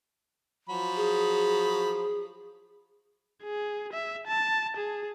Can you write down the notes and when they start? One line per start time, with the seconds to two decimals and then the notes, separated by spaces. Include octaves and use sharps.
0.69 F3 F#3 B5
0.96 G#4
3.44 G#4
3.93 E5
4.27 A5
4.77 G#4